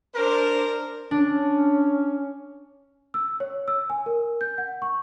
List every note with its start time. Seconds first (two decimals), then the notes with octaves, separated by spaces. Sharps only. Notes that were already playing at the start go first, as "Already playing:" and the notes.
0.14 D4 A#4 C5
1.11 C#4 D4
3.14 E6
3.40 C#5
3.68 E6
3.90 G#5
4.06 A#4
4.41 G6
4.58 F#5
4.82 C#6